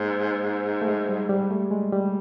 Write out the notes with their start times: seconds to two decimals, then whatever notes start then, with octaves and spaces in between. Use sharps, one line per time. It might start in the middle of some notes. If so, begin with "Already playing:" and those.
Already playing: G#2 A#3
0.82 A3
0.88 G#3
1.09 G3
1.29 G3
1.51 A3
1.71 G#3
1.92 G3